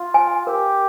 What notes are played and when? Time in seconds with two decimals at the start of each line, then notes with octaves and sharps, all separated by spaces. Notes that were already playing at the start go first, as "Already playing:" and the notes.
Already playing: F4
0.14 G#5
0.47 G4 A#4